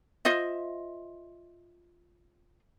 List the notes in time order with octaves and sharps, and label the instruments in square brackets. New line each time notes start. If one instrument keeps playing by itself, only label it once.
[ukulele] F4 C5 D#5 E5